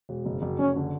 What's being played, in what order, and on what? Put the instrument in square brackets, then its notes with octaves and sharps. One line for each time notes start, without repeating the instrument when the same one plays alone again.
[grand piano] E1
F#1
F#1
[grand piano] F#1 [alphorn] C#4
[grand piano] D3